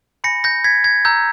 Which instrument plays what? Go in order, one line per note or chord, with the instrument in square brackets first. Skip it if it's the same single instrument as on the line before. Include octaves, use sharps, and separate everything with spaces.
[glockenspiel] G#5 B5 G6 A#6 C#7
G6 A#6
G#6 B6
G#6
A#5 E6 G6